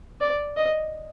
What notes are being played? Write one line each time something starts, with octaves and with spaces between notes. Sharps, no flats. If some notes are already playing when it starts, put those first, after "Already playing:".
D5
D#5